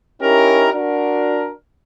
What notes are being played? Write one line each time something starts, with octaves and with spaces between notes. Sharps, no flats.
C#4 D#4 E4 G4 A#4
D4 F#4 A#4